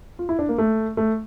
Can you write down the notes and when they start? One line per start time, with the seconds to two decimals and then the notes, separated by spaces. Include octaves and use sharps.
0.19 F4
0.29 E4
0.39 D4
0.49 A#3
0.58 A3
0.97 A3